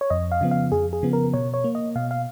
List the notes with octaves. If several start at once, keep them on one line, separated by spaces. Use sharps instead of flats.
C#5
F2 D#5
F5
C#3 F3 B3
F5
F2 G#4
G#4
C#3 F3 B3
A#4
B2 C#5
C#5
A#3
D#5
B2 F5
F5